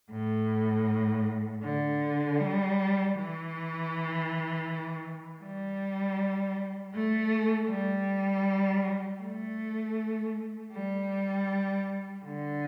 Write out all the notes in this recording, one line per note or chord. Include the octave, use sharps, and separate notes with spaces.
A2
D3
G3
E3
G3
A3
G3
A3
G3
D3